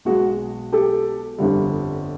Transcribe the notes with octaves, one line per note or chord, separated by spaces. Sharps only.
B1 B2 G#3 F#4 G#4
G4 A4
G1 F2 D3 G3